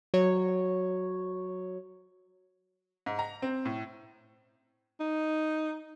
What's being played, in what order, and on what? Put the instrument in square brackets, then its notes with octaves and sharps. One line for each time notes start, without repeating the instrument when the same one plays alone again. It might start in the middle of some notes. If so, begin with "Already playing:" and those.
[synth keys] F#3 C#5
[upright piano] G#2
A#5
C4
A2
[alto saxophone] D#4